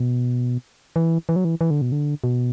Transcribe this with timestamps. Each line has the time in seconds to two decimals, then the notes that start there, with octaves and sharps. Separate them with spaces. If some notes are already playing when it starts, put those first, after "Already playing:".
Already playing: B2
0.96 E3
1.29 E3
1.36 F#3
1.45 E3
1.61 E3
1.71 D3
1.82 B2
1.92 D3
2.24 B2